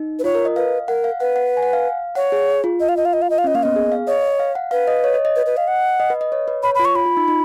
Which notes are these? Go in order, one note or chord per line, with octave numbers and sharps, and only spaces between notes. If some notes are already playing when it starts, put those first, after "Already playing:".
Already playing: D#4
B4
F4 C#5
A#4
D#5
B4 F5
A#4 F#5
F5
B4 F#5
F#5
G#5
F#5
F5
C#5 F#5
G#4
F4
D#5
F5
D#5
F5
D#5
F5
D#5
F5
C#4 D#5
A#3 F5
B3 D#5
G#4
F5
C#5 D#5
F5
F#5
B4 F5
D#5
C#5
D#5
D#5
B4
B4
F5
F#5
D#5
B4
D#5
C#5
B4
C#5 B5
B5
F4
C#6
F4 B5
F4
D#4
D#4